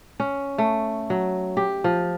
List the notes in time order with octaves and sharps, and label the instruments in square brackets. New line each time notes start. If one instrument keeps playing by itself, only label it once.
[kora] C#4
A3
F#3
G4
F3